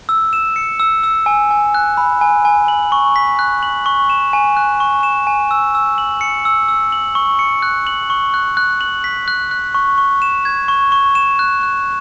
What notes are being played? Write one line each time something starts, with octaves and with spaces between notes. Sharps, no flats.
E6
E7
C#7
E6
E6
G#5
G#5
F#6
B5
G#5
G#5
F#7
C#6
B6
F#6
F#7
C#6
E7
G#5
F#6
C#6
E7
G#5
E6
E6
F#7
C#7
E6
E6
F#7
C#6
C#7
F#6
F#7
C#6
F#6
F#6
F#7
B6
F#6
F#6
C#6
C#6
E7
G#6
C#6
C#6
E7
F#6
F#6